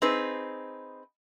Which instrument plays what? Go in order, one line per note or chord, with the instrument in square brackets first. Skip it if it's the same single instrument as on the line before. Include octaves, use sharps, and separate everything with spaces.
[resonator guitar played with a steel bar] C4 D#4 G#4 B4